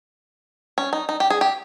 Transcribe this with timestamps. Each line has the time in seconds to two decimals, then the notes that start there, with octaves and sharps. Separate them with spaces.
0.78 C#4
0.93 D#4
1.09 D#4
1.20 G4
1.30 G#4
1.41 G4